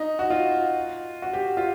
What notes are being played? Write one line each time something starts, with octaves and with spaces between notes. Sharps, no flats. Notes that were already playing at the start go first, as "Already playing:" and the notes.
Already playing: D#4
F#4
F4
F#4
G4
F4